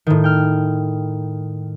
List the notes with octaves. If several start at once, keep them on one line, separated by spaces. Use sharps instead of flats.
A2 D#3
G5 F6